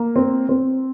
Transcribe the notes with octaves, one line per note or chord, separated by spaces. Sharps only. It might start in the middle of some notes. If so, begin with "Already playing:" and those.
Already playing: A#3
C4
C4